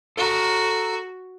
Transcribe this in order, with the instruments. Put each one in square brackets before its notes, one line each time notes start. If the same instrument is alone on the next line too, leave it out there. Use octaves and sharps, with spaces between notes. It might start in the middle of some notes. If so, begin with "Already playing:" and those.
[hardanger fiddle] F#4 [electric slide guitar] A4 A#5